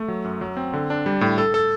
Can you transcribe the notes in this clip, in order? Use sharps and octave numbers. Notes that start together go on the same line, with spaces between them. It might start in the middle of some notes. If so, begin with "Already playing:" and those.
Already playing: A3
F#3
F#2
F#3
C4
D3
D4
G3
A2
A4
A4